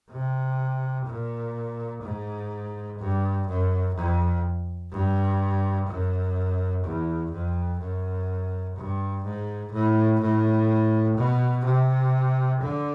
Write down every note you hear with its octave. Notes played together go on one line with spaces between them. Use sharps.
C3
A#2
G#2
G2
F#2
F2
G2
F#2
E2
F2
F#2
G2
G#2
A2
A2
B2
C3
D3